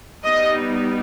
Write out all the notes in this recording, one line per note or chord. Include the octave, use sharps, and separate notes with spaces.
G3 B3 D#4 D#5